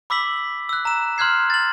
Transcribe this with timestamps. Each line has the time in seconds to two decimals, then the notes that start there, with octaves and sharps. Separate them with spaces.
0.10 B5 D6 E6 B6 F#7
0.69 E6 F#6
0.85 A#5 E7
1.18 C6 F6 F#6 G#6 C7
1.50 A6 F#7